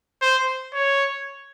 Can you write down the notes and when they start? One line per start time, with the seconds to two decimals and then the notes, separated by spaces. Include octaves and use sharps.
0.22 C5
0.74 C#5